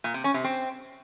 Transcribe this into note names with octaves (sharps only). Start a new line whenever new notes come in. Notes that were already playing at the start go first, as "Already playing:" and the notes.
A#2
C3
C#4
C3
C4